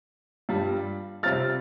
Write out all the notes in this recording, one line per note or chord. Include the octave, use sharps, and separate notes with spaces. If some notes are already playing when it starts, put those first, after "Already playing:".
G2 G3 F4
C3 G3 C4 F4 F6 A6